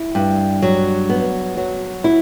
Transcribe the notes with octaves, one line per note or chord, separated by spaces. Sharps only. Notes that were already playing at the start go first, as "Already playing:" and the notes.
Already playing: E4
G2
F#3
B3
F#3
E4